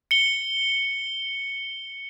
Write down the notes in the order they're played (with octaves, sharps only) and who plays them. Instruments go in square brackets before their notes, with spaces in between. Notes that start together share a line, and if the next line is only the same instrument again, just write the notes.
[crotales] C#7 G7